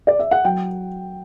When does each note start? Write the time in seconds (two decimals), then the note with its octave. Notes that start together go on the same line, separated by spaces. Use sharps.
0.07 D5
0.19 E5
0.31 F#5
0.44 F#3 G5